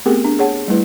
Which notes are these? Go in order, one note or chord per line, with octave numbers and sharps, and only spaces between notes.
A3 B3 C4 G4 G#4 A#4
D4
G#4 C#5 F#5 A5
G3 A3 E4 B4